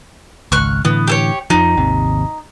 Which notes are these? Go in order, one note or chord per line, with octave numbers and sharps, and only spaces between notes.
G#1 C#2 C#6 F6 F#6
A2 D3 E3 B3
G4 A4 C#5
F2 F3 D#4
G#1 D#2 C3